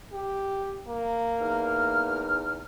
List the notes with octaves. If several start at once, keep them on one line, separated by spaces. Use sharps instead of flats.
G4
A#3
E2 D#4 F6